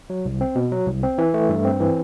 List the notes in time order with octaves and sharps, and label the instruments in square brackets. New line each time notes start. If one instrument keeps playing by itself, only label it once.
[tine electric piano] F#3
C2
C4
B2
F#3
C2
C4
E3
A3
G2
C4
E3